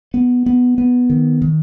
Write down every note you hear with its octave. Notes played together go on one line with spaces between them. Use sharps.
B3
B3
B3
D#3
D#3